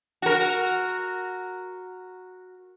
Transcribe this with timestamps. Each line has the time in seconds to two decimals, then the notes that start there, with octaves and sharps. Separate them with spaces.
0.22 F#4 A#4